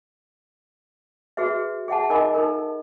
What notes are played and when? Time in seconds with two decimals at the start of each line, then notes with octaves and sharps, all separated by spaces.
1.37 F#4 G#4 B4 E5
1.88 G#4 E5 F#5 A5
2.10 D#4 A#4 D#5 G#5 B5 D6
2.35 D#4 A4 A#4